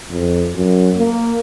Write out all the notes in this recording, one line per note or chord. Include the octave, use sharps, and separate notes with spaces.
F2
F#2
A#3